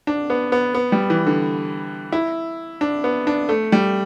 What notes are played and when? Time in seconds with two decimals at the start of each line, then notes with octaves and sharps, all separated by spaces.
0.07 D4
0.30 B3
0.52 B3
0.75 B3
0.92 G3
1.10 E3
1.26 D3
2.12 E4
2.81 D4
3.04 B3
3.27 D4
3.49 A3
3.72 G3